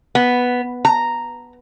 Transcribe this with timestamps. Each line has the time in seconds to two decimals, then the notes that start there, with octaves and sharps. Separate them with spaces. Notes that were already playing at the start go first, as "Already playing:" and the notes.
0.15 B3
0.85 A#5